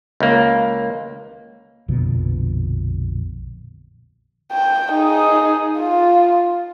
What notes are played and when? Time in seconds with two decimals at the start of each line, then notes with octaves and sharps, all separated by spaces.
0.20 C#2 A#3
1.88 A#1 F2 B2 D3
4.52 G5
4.92 D#4 G#4
5.79 F4